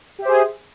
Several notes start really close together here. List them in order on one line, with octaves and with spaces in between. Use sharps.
G4 E5 C5 G#4